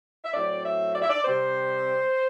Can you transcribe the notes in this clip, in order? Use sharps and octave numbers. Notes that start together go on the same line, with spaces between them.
E5
A2 F#3 C4 D5
E5
D5
E5
D5
C3 G3 C4 C5